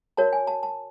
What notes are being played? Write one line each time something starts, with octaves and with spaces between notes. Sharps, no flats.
F#4 A#4 C#5 A5
G#5
A5
A5